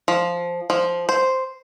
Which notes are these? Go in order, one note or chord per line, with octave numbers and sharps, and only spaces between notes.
F3
F3
C5